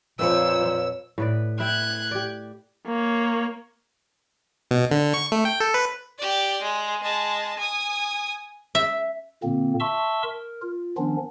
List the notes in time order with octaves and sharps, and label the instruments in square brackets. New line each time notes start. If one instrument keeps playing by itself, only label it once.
[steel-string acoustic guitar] F2 B4 C#5 [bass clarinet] A#2 [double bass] F3 [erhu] E6
[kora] A2 B4 D5
[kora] E4 E5 G5 [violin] F#6 G#6
[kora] G4 D5
[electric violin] A#3 C#5
[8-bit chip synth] B2
D3
C#6
A3
G5
A4
B4
[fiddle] G4 D5
G#3
G#3 A5
G#5 D#6
[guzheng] E5
[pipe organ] A#2 D3 A#3 C4
E5 A5 C6 C#6 E6
A#4
F4
D#3 F3 B3 C#4 D4